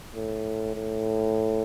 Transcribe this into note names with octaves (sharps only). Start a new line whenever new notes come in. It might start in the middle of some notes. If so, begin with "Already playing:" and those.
A2
A2